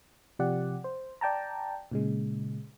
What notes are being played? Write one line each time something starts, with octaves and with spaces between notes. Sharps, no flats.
C3 F3 G4 D5 F#5
C5
D5 G5 A5 A#5
A#2 C#3 G#3